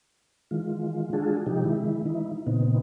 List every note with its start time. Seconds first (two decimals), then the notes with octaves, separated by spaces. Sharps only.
0.51 D#3 E3 G#3 F4
1.13 G#3 D4 F4 F#4 G#4 A4
1.46 C3 F3 D#4 G4
1.65 D#3 G#3 E4
2.06 E3 D#4 E4
2.47 A#2 C#3 B3 C4 D#4